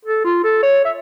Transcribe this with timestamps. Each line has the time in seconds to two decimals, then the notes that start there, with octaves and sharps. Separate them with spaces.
0.05 A4
0.25 F4
0.44 A4
0.63 C#5
0.85 E5